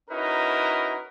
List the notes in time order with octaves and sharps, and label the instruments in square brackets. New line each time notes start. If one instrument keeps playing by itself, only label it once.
[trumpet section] C#4 D#4 E4 F#4 A#4 B4